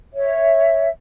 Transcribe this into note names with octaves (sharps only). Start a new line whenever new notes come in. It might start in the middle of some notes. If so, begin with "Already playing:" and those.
C#5 E5